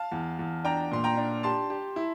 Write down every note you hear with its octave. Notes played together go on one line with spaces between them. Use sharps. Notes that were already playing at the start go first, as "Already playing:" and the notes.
Already playing: F5 A5
E2
E2
D4 G5 A#5
A#2 C6
G5 A#5
D4
G4 A5 C6
G4
E4